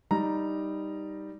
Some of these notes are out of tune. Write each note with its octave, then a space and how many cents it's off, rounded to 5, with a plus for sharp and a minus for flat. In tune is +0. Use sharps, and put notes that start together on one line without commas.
G3 +0 D#4 +0 A#5 +0